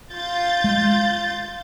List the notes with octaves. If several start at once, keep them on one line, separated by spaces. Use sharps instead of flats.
F4 G6 A6
G#3